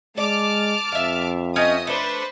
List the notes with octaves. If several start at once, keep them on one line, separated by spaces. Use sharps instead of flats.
G#3 D5 A5 D6 F6
F2 E5 F5
C#4 D#4 D#5 E5 D#6
A3 D4 B4 C5